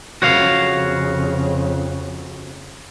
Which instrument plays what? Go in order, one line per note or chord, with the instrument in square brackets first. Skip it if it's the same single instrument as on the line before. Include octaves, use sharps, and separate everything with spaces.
[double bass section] F2 C#3 [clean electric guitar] F#4 C#5 F5